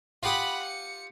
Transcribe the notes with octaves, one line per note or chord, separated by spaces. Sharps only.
F4 G4 F#5 B5 D#6
C#7